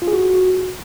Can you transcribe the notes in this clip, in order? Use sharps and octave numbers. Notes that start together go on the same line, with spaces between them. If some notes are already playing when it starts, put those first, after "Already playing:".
F4
G#4
F#4